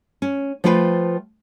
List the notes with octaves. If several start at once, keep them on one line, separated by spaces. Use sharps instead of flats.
C#4
F3 A3 F4 B4 F#5 G5